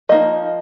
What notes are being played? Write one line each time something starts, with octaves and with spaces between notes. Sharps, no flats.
F3 A#3 D#4 D#5